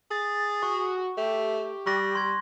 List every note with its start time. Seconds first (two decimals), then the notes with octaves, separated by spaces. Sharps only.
0.11 G#4 A6
0.63 F#4 C#6
1.17 A3 G4
1.86 G3 C#6 F#6 A#6
2.15 C6 G#6